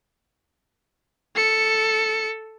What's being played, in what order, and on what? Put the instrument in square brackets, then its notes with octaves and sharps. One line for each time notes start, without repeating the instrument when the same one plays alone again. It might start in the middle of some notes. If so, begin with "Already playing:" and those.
[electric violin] A4 C#7